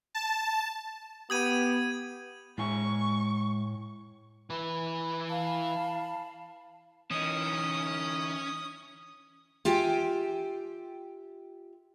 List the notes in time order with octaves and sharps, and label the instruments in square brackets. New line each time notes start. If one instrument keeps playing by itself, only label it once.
[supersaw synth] A5
[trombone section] B3 [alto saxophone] G4 [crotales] D#6 G#6 D#7
[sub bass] A2 [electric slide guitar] G#3 E4 G#5 [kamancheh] C#6
[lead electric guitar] E3 B4
[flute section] F5 A5 B5
[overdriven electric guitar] E3 D#4 [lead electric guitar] C#4 [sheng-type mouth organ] D#6
[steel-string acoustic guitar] F4 G4 E5 G5 G#5